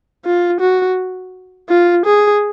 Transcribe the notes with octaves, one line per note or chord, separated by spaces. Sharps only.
F4
F#4
F4
G#4